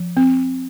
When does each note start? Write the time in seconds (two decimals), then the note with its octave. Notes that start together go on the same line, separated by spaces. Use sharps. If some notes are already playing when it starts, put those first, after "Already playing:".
Already playing: F3
0.17 C4